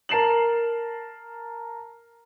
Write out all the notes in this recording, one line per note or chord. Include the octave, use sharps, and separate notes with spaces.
A#4 A5 C7 E7 F#7